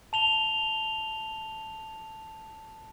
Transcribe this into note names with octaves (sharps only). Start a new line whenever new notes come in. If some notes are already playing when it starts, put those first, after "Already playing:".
A5 F7 G7